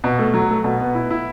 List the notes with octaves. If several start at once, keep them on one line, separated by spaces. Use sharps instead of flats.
B2
A3
F#3
A3
B2
B3
E4
E4